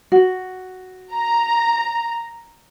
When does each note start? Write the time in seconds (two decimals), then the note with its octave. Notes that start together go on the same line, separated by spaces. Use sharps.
0.12 F#4
1.13 A#5